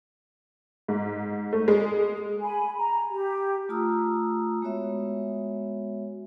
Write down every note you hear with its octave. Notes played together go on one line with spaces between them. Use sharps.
G#2
A3
G#3
G#5 B5
A#5
G4
A3 F4 A#5 D#6 E6
G#3 B3 F#4 C#5 E5